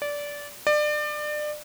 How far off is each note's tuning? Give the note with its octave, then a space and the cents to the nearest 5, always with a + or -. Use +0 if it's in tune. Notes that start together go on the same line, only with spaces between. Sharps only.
D5 -15
D5 +30